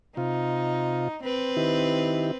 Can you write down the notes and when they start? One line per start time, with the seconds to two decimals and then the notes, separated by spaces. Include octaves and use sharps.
0.17 C3 D#4 F4
1.24 C4 B4
1.57 D#3 E4 G4